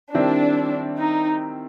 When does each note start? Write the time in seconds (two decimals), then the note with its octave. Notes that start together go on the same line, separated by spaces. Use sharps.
0.14 D#3 G3 C4 D4 E4
0.99 D#4